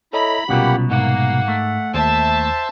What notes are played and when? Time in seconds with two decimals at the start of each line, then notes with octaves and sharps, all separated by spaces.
0.13 E4 A4 C#5 D#5 A#5 B5
0.49 C2 B2 F#3 A#3 C#4 F4 G4 F#5
0.91 G#2 A#3 F#5
1.48 A3
1.94 D#2 C5 E5 A5 C6 E6